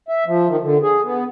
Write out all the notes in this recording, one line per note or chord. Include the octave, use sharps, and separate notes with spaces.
E5
F3
D#3
D3
G#4
B3